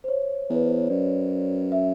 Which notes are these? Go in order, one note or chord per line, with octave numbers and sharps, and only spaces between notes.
C5
C#5
E2
B4
C5
C#5
F#2 D5
E5